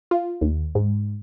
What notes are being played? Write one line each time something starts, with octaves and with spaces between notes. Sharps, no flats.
F4
D#2
G#2